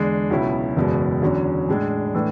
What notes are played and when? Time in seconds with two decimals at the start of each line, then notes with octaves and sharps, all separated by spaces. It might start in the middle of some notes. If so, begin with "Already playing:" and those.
Already playing: E2 D3 G#3 D4
0.30 C#2 B2 F#3 C#4 E4
0.76 F#1 E2 B2 G#3
1.22 E2 D3 F#3 C#4
1.69 A2 G#3 D4
2.14 A2 E3 A3 D4